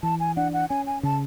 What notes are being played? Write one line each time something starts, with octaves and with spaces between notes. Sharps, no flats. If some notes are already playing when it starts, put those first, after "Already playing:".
E3 A5
G#5
D4 F#5
F#5
C#4 G#5
G#5
C#3 A5